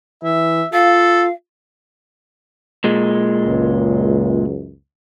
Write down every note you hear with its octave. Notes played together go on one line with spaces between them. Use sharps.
E3 E5
F4 A4 F5
A#2 G#3
C#2 F#2